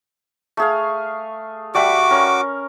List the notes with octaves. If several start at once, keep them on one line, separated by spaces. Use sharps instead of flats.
A3 G#4 F5
G3 A3 F#4 B5 D6
C#4 A#4